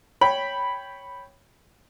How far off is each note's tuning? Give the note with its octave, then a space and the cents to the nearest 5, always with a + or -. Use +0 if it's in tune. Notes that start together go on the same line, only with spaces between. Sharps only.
C#5 -5 G5 +0 B5 +0